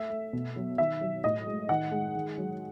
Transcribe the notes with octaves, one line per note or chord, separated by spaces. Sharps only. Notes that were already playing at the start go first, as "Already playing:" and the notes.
Already playing: A3 E5
A3
B2
F#3
D#3 E5
F#3
A2 D#5
G#3
D#3 F#5
G#3
D#3
F#3